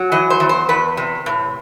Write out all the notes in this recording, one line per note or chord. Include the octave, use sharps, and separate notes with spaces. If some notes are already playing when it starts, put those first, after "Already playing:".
Already playing: F#3
E3 D#5
C5
E2
C5
E2 B4
C3
A2